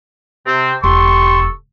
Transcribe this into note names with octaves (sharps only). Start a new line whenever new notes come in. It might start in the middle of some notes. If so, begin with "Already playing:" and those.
C3 C4
E1 C3 G4 A4 C6 C#6